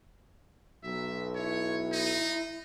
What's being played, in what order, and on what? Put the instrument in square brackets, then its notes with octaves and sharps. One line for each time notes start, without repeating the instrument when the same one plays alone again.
[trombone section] B1 [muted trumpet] E5
[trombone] E4 [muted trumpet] C#5
[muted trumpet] D#4